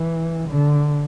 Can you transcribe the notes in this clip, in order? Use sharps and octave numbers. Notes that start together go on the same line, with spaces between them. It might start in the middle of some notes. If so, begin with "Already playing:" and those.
Already playing: E3
D3